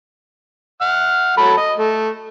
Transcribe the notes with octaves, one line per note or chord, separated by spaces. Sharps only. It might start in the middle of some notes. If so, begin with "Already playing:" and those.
F#5 F6
F#3 A4 B5
D#5
A3